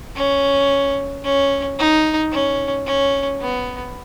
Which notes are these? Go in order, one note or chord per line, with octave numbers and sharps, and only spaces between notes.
C#4
C#4
D#4
C#4
C#4
B3